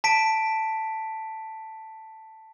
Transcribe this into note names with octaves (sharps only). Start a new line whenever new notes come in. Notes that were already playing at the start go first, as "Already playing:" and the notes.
A5 B6 D7